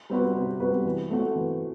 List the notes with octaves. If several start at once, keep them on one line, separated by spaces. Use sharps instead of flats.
G3 C4 F#4 B4
C3
G3 C4 F#4 B4
E3
A3 C4 F#4
E3